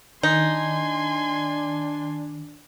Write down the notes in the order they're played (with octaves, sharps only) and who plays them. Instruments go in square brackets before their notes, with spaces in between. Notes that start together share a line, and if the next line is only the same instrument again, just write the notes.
[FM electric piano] D#3 [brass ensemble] D4 [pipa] D#4 [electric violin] G#5 C6